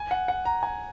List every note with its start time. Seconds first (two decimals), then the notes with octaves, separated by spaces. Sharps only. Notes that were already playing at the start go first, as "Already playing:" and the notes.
Already playing: G#5
0.11 F#5
0.28 F#5
0.45 A#5
0.63 G#5